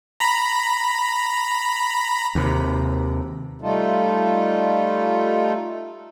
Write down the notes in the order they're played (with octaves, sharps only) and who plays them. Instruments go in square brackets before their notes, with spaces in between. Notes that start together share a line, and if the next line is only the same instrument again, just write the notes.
[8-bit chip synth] A#5 B5
[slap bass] D#2 C3
[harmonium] G3 A3 D#4 F4 A4